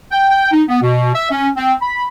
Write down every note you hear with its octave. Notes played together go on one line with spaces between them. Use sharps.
G5
G5
D#4
B3
B2
E5
C#4
C4
B5